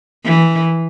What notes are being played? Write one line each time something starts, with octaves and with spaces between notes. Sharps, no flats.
E3